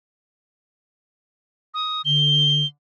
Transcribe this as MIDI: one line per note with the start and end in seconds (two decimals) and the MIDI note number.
1.74 2.02 87
2.05 2.62 50
2.05 2.66 103